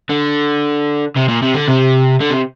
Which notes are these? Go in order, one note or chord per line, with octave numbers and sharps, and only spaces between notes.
D3
C3
A#2
C3
D3
C3
D3
C3